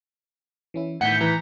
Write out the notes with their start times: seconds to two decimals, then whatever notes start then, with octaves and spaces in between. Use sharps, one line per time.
0.74 E3 C#4 E4
1.01 E2 A2 D#3 E3 F#5 G6 B6 C#7
1.21 E3 A#5